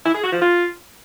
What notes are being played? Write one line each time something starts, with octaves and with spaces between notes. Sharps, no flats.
E4
G#4
F#4
F3
F4